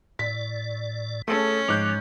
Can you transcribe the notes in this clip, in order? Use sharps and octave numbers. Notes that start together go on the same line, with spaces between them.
A2 D5 B6
A3 C#4 G#4 A4
G#2 F3 D6 F#6 G6